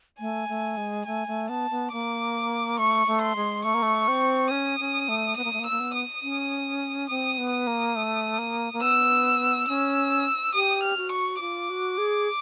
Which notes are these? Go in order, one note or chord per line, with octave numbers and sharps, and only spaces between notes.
A3 G#5
A3
G#3
A3 G#5
A3
B3 A5
B3
A#3 D6
A3 C#6
A3
C6
G#3
A3 C#6
A#3
A3
C4
C#4 D#6
C#4
A3
B3 D#6
A#3
A3
A#3
E6
A#3
B3
D#6
C#4
C4 D#6
B3
D#6
A#3
A3
A#3
A#3
B3 E6
C#4 E6
G4 D#6
F6
F#4
C#6
F4 D6
F#4
G#4